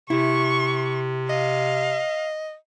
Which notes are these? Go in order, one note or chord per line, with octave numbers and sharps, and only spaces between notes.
C3 E4 C#6
D#5 F5